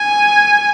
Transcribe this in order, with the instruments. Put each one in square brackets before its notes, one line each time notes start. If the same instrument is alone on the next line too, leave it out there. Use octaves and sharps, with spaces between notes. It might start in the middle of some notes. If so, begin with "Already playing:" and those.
Already playing: [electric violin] G#5